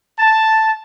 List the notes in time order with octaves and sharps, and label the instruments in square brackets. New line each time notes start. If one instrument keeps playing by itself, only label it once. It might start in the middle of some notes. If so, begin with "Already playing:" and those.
[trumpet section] A5